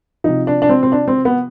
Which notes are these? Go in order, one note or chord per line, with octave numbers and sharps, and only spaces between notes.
C3 F3 D#4
D4
D4
C4
C4
D4
C4
B3